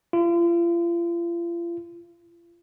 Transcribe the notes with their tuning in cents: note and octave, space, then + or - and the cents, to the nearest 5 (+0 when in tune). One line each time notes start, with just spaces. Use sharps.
F4 -40